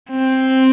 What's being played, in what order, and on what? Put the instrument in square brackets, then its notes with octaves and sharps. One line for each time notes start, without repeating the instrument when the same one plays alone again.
[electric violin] C4